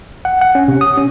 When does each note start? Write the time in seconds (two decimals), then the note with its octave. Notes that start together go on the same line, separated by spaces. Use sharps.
0.25 F#5
0.41 F#5
0.55 C#4
0.68 C3
0.81 D#6
0.97 C#4